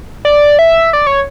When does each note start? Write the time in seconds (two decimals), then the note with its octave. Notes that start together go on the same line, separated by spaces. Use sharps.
0.25 D5
0.59 E5
0.93 D5
1.07 C#5